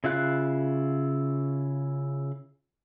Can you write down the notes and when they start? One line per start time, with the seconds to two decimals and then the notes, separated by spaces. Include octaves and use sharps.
0.04 C#3 E4 F4 F5 F#6